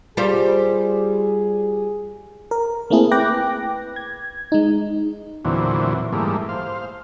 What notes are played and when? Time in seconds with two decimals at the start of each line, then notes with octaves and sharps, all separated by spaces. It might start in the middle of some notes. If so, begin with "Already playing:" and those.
0.17 G3 F4 G#4 C5
2.51 A#4
2.90 A3 A#3 C4 E4 G#4 A4
3.11 B4 G5 D6 F#6 A#6
3.96 G#6
4.52 G#3 D#4
5.45 E2 A#2 D3 E3 F#3 C4
6.13 G#2 E3 G3 A3 A#3
6.49 C5 F5